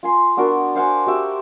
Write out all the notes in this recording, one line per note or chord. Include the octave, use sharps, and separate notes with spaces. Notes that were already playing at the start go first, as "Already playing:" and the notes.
F4 G#5 C6
B3 D4 F#4 A#4
C5 F5 F#5 G#5
F#4 G4 E5